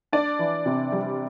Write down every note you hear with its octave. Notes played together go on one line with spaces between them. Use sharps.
D4 D5
E3
C3
G3